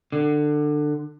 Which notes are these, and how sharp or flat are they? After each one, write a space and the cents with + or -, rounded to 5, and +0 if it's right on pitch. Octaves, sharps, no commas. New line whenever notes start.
D3 +20